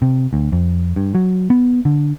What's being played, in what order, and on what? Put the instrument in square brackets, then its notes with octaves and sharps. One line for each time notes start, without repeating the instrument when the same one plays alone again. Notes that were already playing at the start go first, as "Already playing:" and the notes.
[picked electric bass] C3
D2
F2
G2
F#3
B3
D3